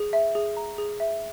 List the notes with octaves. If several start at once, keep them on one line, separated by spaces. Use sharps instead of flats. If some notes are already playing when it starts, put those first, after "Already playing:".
Already playing: G#4
E5
G#4
A#5
G#4
E5